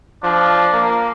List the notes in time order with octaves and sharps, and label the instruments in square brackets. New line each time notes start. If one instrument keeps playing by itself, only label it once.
[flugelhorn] F3 [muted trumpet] D4
[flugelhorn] A#3